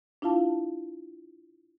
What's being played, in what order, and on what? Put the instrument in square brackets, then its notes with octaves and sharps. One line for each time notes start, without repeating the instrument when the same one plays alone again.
[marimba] D4 E4 F4 F5 A5